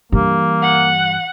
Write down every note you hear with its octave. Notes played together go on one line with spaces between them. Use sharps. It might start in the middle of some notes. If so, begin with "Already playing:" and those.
G2 E3 A#3
F#5